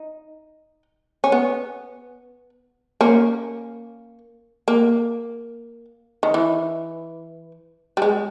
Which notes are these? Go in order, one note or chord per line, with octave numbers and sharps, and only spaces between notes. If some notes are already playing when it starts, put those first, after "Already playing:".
Already playing: D#4
C#4
B3
A#3 C#4
A#3
D#3
E3
G3
G#3